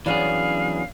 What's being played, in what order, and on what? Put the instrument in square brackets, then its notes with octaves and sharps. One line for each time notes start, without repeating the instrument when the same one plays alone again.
[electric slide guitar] E3 F#3 G#4 [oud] B3 C#4 D4 [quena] F5